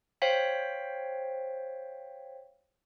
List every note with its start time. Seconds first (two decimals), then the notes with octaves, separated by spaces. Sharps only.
0.22 C5 C#5 F5 G5 B6